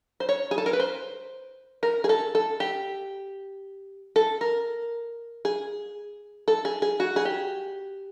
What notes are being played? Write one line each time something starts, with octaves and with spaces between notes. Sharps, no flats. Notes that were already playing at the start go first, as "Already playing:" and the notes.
C5
C#5
G#4
A4
A#4
B4
C5
A#4
G#4
A4
A4
G4
A4
A#4
G#4
A4
G#4
G#4
F#4
G#4
G4